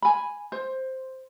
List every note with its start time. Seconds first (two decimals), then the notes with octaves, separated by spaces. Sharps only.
0.02 G#5 B5
0.52 C5